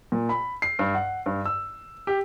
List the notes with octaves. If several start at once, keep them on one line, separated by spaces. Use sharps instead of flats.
A#2
B5
C7
G2
F#5
G2
E6
G4